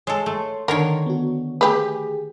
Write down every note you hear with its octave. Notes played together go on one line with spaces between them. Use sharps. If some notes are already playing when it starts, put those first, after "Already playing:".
G#3 A4 C#5 C6
A3
D3 D#3 A#4 C#5 C6
B3 F#4
A3 G4 G#4 B4